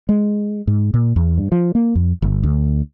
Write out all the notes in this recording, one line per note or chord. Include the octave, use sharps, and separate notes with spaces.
G#3
G#2
A#2
E2
G2
F3
A#3
F2
G1
D2